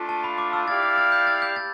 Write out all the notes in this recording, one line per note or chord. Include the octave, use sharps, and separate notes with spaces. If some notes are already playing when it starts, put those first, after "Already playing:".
Already playing: A3 D4 F4
A5
B5
D6
E6
E4 G4 D5 F5 A6
A6
A6
G6
A6
G6
A6